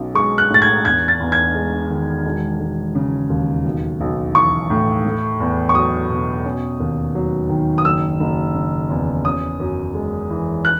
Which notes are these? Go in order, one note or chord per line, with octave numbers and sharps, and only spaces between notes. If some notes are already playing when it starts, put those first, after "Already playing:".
Already playing: B1 C#4
G#3 C#6
F#6
A2 A6
G#6
E2 G#6
A6
E2
G#6
G#3
D#3
E1
E1
C#3
D#2
B1
B1
E3 C#6
A2
A3
E2
C#6
F#3 D#6
B2
C#4
D#2
F#3
D#3
D#6
F#1 E6
F#1
C#3
E2
C#4 D#6
F#2
G#3
E3
F#6